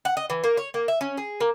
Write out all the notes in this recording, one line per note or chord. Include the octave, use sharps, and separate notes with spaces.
F#5
D#5
E3
A#3
C#5
A#3
E5
C#4
G#4
A#3